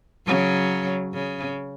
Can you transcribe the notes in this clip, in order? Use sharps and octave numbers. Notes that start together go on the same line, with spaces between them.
C#3 F#3
C#3